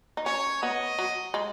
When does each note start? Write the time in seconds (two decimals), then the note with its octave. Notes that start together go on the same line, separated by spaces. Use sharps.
0.17 D#4
0.26 C#4 C#5
0.62 B3 D#5
0.99 F#3
1.34 G#3